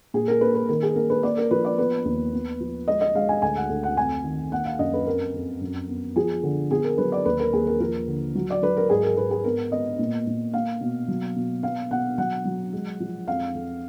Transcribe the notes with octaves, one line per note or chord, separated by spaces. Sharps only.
A#2 G#4
A#4
A#3 B4
B4
D#3 A#4
G#4
A#3 A#4
B4
A#3 D5
A#4
F3 B4
D5
B3 B4
D#2
B3
F3
G#3 D#5
D#5
G#3 F5
G#5
D2 G#5
F#5
D2
F#5
F2 G#5
D#3
A#3 F#5
F5
F#2 D#5
B4
F2 A#4
F2
F#2
B3
F3 G#4
D3
B3 G#4
A#4
F#3 B4
D5
D#2 B4
A#4
D#2 G#4
A#4
F3 A#4
D3
F#3
D5
F#3 B4
A#4
G#2 G#4
A#4
G#2 B4
G#4
B3 A#4
B3 D#5
A#2
A#2
A#3 F5
B2
F#3
B2
B3 F5
B2 F#5
F#3 F#5
F#3
G#3
F3
F2 F5
F2